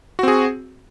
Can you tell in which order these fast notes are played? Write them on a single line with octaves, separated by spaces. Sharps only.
F#4 C4 G#4